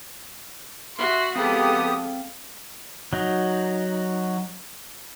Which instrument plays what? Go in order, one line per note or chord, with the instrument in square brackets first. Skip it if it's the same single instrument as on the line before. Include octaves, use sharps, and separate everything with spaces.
[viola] F#4 [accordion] E5 [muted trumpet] C6
[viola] G#3 A4 [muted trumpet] B3 [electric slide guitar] C4 F5 G5 [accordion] G4 D#6
[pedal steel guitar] F#3 D#4